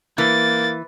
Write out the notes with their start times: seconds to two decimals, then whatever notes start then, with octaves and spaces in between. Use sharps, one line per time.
0.18 E3 A#3 A6